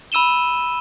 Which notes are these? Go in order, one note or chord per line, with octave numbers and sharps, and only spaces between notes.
B5 E6 D#7 E7 G7